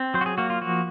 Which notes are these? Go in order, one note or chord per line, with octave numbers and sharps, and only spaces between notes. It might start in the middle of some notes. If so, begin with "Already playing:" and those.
Already playing: C4
F#3 C5
F#4
G#4
A#3 F#4
F4
F3 F#4